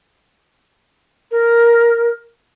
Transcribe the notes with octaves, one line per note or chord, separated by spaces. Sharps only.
A#4